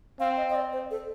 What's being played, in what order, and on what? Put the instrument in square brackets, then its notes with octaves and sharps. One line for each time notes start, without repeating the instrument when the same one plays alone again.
[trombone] C4 [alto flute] F5
[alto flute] D#5
D#5
D5
C5
A4